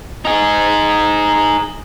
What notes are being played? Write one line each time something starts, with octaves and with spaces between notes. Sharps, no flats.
D#4 G#4